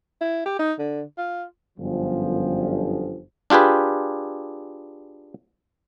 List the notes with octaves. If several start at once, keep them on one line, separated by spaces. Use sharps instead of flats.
E4
G4
D#4
D3
F4
G1 F#2 F3
D4 F4 G4 G#4 B4